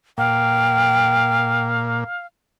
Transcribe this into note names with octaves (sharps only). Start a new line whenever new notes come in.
A#2 F5 G5